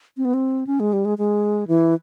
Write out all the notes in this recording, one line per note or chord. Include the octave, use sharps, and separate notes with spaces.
C4
B3
C4
C#4
G#3
G3
G#3
G#3
E3